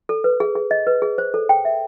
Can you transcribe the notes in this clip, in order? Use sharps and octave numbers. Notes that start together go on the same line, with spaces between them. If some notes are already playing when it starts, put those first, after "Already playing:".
A4
B4
G#4
G#4
D#5
B4
G#4
C5
A4
G5
E5